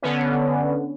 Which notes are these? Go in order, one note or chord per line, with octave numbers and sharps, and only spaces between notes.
D3 B3 C#4